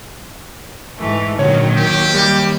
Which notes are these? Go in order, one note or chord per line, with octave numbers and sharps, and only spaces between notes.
G#2 E3 A3
A#2 D3 D#3 F#3 C#5
D#2 G4
G3 G6